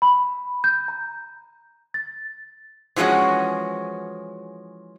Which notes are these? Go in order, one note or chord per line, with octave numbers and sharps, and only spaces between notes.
B5
G6
A#5
A6
E3 F3 G#3 C#4 F#4